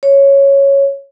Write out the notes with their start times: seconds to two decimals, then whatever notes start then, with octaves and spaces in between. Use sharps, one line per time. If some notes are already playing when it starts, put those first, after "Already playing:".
0.03 C#5